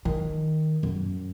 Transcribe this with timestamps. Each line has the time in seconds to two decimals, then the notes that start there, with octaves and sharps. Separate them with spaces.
0.05 D#3
0.83 F#2